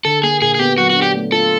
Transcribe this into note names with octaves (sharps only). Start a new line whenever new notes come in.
D3 A4
A#3 G#4
A#2 G#4
G#4
B3 G4
F#3 F#4
F#4
D4
G4
A3
F4 A4